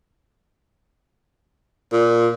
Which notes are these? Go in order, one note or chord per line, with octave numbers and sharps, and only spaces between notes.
A#2